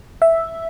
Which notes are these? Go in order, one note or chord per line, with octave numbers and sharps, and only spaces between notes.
E5